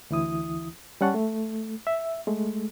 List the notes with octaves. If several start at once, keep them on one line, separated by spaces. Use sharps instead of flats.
D2 E3 E4 D#6
G3 C#4 F#5 A5 C#6
A3
E5
G#3 A3